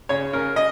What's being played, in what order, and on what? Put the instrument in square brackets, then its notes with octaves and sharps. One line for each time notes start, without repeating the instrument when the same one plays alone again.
[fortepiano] C#3 C#5
C#3 A#4
D#5